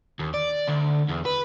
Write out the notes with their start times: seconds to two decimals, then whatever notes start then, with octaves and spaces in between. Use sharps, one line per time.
0.19 D#2
0.34 D5
0.68 D2
1.10 E2
1.26 B4